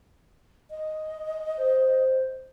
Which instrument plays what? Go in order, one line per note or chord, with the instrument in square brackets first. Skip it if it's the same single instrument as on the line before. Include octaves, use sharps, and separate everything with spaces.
[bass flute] D#5
[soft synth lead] C5